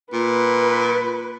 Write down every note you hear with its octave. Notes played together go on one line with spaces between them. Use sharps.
A#2 B4